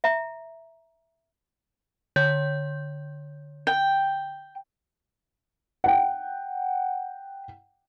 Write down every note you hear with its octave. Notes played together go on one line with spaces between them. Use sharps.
E5 A#5
D3 C#5 G6
G5
F#5 G5